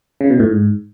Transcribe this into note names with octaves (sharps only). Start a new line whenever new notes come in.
C#3
B2
A2
G#2